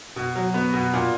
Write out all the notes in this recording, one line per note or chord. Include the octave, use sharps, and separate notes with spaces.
B2
F#3
B3
B2
A#2